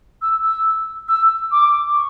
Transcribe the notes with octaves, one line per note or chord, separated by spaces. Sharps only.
E6
E6
E6
D6
C#6